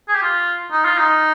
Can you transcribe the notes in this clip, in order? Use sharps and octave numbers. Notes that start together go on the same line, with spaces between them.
G#4
G4
F4
D#4
F4
D#4